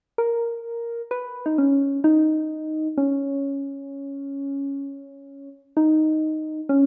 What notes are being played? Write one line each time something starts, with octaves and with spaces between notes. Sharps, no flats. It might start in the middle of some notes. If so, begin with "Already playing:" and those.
A#4
B4
D#4
C#4
D#4
C#4
D#4
C#4